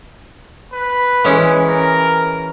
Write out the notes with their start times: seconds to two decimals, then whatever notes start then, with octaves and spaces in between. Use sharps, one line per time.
0.73 B4
1.24 E3 G#3 C#4
1.68 A#4